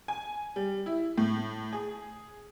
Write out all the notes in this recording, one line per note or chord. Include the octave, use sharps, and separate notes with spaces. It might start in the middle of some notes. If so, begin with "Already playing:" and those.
G#5
G3
E4
A2
G#4